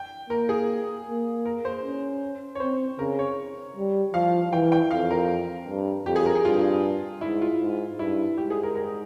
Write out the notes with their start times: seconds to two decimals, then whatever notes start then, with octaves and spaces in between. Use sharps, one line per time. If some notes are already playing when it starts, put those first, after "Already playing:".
Already playing: G5
0.30 A#3 A#4
0.49 G#4
1.07 A#3
1.45 A#4
1.65 C5
1.83 C#4
2.55 C#5
2.60 C4 C5
2.99 C#3 A#4
3.19 C#5
3.76 G3
4.14 F3 F5
4.52 E3 G5
4.72 G5
4.91 F2 F5
5.11 A#4
5.68 G2
6.06 F2 G4
6.16 G#4
6.26 A#4
6.35 G#4
6.45 G2 F4
7.21 G#2 E4
7.41 F4
7.61 G#2
7.98 G2 E4
8.37 G#2 G4
8.50 G#4
8.63 A#4
8.75 A#4